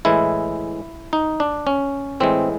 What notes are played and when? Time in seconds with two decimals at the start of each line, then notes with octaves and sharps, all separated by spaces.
0.05 A2 E3 G#3 E4
1.13 D#4
1.40 D4
1.67 C#4
2.20 A2 E3 G#3 C4